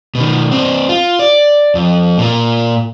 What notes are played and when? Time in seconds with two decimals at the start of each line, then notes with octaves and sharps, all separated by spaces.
0.15 B2 D#3
0.51 C4 D4
0.89 F4
1.19 D5
1.75 F2
2.18 A#2 A#3